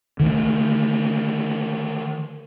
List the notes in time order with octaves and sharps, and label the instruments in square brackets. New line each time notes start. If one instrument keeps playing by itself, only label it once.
[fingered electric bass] D3 D#3 G3 A3